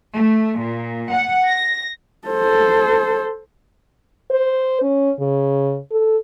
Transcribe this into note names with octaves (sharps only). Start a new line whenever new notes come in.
A3
A#2
F#5
A#6
A4 C5
C5
C#4
C#3
A4